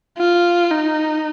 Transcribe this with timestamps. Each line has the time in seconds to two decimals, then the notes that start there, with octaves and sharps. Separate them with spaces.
0.18 F4
0.72 D#4